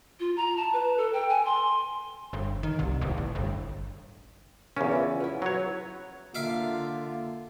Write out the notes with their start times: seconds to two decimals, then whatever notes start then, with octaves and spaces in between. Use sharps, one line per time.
0.20 F4
0.37 A#5
0.57 A5
0.73 B4
0.98 A4
1.13 G5
1.29 G#5
1.45 C6
2.33 G1
2.63 D#3
2.79 C2
3.01 D1
3.18 A1
3.35 G1
4.77 E2 C#3 A#3 C#4
4.91 F4 A4
5.20 B3 E4
5.42 F#3 B4 C#5
6.35 D3 A#3 F4 E5 F5 D6